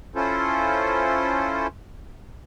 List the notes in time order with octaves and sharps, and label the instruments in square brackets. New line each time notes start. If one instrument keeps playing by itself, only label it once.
[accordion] C#4 E4 F4 A4 C5